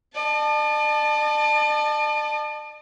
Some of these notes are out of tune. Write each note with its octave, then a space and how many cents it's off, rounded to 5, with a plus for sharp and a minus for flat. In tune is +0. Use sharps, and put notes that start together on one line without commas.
D5 +45 A5 +0